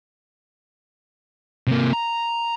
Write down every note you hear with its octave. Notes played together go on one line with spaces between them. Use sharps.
C3 A#3
A#5